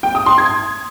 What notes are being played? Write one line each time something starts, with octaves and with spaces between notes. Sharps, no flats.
G5
D#6
C6
G#6